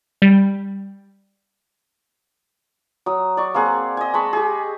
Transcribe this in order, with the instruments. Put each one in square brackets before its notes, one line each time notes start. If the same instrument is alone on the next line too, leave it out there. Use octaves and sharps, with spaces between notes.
[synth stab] G3
[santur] F#3 D#6
D5 C#6
A#3 C4 G#4 F#5
D#5 G#5
G#3 A5 B5 C#6
G4 G#4